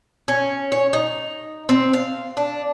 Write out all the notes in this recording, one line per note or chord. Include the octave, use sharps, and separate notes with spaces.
C#4
C#5
D#4
C4
F5
D4